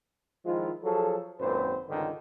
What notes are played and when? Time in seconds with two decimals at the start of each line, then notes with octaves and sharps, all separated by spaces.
0.45 D#3 F3 G#3 E4 F4
0.84 F3 F#3 G#4 A4
1.40 G#1 F#2 A#2 C4 B4 C5
1.89 C#2 G2 D3 D#3